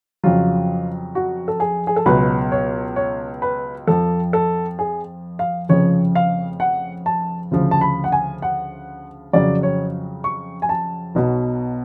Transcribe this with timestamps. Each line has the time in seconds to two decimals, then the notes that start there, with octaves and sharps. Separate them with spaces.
0.23 F2 C#3 F#3 F4
1.15 F#4
1.48 A4
1.60 G#4
1.87 G#4
1.96 A4
2.06 C#2 B2 F#3 B4
2.52 C#5
2.96 C#5
3.42 B4
3.87 F2 F3 A4
4.33 A4
4.79 G#4
5.39 F5
5.69 F1 F2 C#3 F3 C#5
6.15 F5
6.60 F#5
7.06 A5
7.51 D2 C#3 F3
7.71 A5
7.81 B5
8.04 F#5
8.12 G#5
8.42 F#5
9.33 F2 C#3 F#3 D5
9.63 C#5
10.24 C#6
10.62 G#5
10.69 A5
11.15 B1 B2 F#3